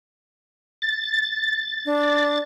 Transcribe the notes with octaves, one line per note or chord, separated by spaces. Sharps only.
A6
D4